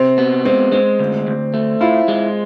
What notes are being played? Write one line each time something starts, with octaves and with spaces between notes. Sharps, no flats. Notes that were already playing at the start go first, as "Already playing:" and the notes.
Already playing: C3 C4
B3
G#3 C4
G#3 C4
D2
D2
A3
E4 F4
G#3